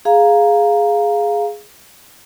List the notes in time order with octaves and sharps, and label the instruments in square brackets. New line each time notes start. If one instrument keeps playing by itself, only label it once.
[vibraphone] G#4 F5 A#5